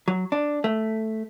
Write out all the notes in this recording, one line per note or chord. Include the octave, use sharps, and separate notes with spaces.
F#3
D4
A3